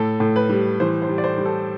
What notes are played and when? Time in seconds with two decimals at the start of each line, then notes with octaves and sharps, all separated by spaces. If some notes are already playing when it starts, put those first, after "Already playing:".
Already playing: A2 A4
0.20 A2
0.36 B4
0.49 G3
0.80 E3 C5
1.02 C5
1.08 G3
1.18 D5
1.24 C5
1.38 G3
1.45 A4